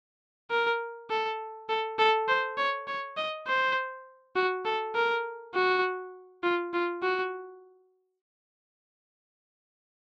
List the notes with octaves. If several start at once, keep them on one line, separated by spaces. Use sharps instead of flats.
A#4
A4
A4
A4
C5
C#5
C#5
D#5
C5
F#4
A4
A#4
F#4
F4
F4
F#4